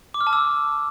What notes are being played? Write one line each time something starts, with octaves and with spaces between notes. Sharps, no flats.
D6
F6
A5
E6